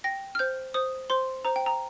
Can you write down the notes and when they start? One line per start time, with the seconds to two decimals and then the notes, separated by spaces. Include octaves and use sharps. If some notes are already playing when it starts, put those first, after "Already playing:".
0.04 G5 A#6
0.35 F6
0.39 C5 G6
0.74 C5 D#6
1.10 C5 C6
1.45 C5 A#5
1.56 G5
1.66 A#5